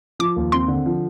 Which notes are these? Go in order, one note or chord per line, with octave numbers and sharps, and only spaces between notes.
F3 D6
D#2
C4 C6
D3
F3